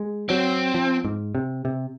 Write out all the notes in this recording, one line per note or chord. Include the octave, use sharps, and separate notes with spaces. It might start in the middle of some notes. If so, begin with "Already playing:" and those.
Already playing: G#3
F#3 C4
F3
G#2
C3
C3